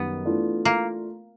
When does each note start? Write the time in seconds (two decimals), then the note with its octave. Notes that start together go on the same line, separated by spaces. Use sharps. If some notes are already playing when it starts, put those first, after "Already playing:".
Already playing: F#2 D#3 G3 B3
0.25 E3 A3 D4 F4
0.65 A#3